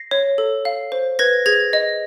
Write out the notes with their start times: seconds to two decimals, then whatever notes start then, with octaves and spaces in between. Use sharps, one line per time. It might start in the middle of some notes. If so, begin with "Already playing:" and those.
Already playing: A#6 C7
0.11 C#5
0.38 A4
0.65 F5
0.92 C5
1.19 B4 G#6 A#6
1.46 G#4 G#6 A#6
1.73 D#5